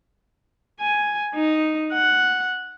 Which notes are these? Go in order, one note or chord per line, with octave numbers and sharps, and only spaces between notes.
G#5
D#4
F#5